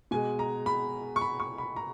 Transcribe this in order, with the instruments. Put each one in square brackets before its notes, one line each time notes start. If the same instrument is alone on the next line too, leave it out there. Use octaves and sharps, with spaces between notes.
[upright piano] B2 G#3 G#5
A#5
B5
C#6
B5
C#6
B5
A#5